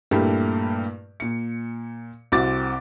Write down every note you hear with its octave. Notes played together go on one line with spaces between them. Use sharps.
G2 A#2 A3 A#3 E4 G4
A#2 C#7
C2 C4 F#4 D6 A6